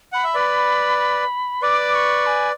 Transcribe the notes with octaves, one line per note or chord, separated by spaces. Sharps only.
F#5 B5
E5
B4 D5
B4 D5 D6
C#6
G#5